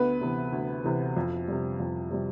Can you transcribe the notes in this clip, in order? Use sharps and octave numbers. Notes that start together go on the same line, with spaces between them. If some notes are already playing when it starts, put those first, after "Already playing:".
Already playing: D2 B3 B4
C3 E3
D2
C3 E3
F2
C3 G3
F2
C3 G3